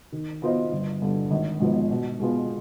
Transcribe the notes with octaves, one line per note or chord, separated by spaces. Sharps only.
D#3
B3 F4 C5 D#5
G1
G2 D3
G#1
G#2 F3 B3
B2
G#3 B3 F4